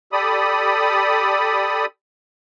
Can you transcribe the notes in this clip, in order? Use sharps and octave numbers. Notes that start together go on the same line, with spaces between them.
G4 A4 D5 B5 D#6